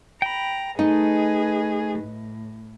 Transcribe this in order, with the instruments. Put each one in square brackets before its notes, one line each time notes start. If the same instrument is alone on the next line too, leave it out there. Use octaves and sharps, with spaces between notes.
[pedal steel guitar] G5 B5 [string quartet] A#5
[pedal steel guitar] A3 [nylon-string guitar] D#4 [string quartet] G#4 B4 D#5
[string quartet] A2